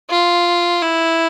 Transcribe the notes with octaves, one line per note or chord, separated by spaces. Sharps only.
F4
E4